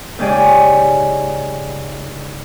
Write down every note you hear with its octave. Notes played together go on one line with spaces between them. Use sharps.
G#2 C#3 G#3 G4 D5 G#5